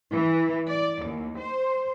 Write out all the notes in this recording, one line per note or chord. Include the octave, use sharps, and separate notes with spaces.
E3
D5
D#2
C5